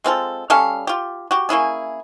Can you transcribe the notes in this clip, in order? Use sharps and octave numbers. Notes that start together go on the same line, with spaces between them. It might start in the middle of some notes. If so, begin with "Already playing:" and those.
G#3 C4 F4 A4
G3 C#4 A4 F5
F4 G4
F#4 G4
A#3 C#4 E4 G#4